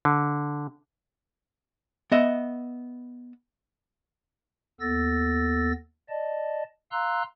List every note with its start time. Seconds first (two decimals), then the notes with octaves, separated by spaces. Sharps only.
0.05 D3
2.12 B3 D#5 E5
4.80 D#2 B3 A4 E6 A6 A#6
6.09 D5 D#5 A5
6.92 F5 A#5 C6 E6 F#6